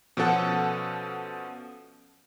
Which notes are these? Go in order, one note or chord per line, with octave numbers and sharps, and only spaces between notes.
B2 F3 C#4 A4 F#5